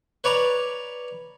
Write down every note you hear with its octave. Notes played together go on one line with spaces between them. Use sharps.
B4 C#5 D5 A#5